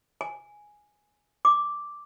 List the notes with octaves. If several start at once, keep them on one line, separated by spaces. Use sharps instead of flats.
G#5
D6